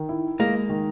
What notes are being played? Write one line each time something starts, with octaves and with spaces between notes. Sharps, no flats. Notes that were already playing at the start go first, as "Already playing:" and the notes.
Already playing: D#3
E4
G#3 A#3
D#3